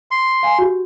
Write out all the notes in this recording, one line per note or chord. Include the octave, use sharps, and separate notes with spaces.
C6
F5 G#5
F#4 G4